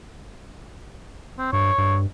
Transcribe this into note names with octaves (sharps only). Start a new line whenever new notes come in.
C4
G2 C#5
G2